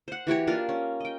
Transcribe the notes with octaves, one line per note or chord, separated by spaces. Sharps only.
C5 F#5
E3 F#4 G4 C#5
A#3 D4 F4 A#4
C#4
D#5 G5